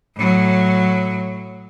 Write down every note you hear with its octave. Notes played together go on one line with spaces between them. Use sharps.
A2 F#3